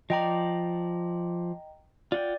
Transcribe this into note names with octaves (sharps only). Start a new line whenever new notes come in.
F3 D5 D#5 G5 A#5
F4 D5 F#5 G5